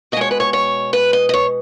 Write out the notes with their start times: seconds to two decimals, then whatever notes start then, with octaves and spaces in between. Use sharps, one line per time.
0.12 B2 D#5
0.17 G#3 C#5
0.31 B4
0.40 C#5
0.53 C#5
0.93 B4
1.13 D#5
1.29 D#5
1.33 C#5